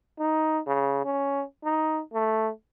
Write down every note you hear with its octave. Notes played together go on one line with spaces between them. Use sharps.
D#4
C#3
C#4
D#4
A3